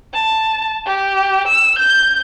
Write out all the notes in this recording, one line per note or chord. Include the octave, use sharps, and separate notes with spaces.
A5
G4
E6
G6